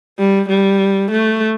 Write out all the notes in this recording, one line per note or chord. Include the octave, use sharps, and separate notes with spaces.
G3
G3
A3